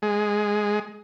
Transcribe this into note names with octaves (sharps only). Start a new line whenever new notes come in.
G#3